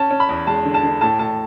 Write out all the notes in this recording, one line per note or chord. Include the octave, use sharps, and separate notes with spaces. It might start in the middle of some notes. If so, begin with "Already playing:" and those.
Already playing: C#4 A5
C#4
B5
E2
G#3 A5
D3
A5
D3
A2 A5
A2 A5